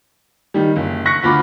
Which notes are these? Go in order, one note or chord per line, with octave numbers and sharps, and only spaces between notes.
D#3 G3
F#1
C#6 F#6 A#6 C#7
D2 F4 B5 D6